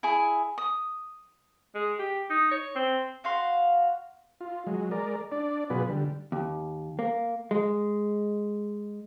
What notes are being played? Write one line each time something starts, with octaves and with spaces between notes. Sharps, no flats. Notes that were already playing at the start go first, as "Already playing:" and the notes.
E4 G#4
D#6
G#3
G4
D#4
C#5
C4
F#4 F5 C6
F4
F#3 G#3
G#3 A#4 D5
D4 D5
B2 F#3 B3 F4 G#4 B4
D3 G3
D#2
A#3
G#3